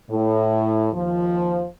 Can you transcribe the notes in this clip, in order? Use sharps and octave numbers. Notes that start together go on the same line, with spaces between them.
A2
D#2 F3